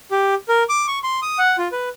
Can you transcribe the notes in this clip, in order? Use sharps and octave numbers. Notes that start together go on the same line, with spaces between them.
G4
A#4
D6
C#6
C6
D#6
F#5
F4
B4